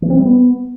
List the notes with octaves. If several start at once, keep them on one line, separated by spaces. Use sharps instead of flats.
E3
C4
G3
B3